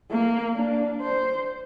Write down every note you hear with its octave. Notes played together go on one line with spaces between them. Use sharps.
A#3
D4
C5